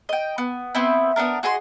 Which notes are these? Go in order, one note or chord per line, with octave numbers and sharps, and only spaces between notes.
D#5 G5
B3
B3 C4 E4
B3 C#4 D4 A#4
F#4 G#4 D#5 C6